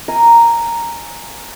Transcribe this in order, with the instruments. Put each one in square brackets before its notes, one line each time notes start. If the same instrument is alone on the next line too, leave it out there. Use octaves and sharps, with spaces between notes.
[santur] F5 G#5 A#5